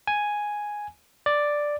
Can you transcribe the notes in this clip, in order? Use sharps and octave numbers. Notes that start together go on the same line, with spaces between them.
G#5
D5